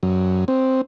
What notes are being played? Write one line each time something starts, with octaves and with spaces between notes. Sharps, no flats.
F#2
C4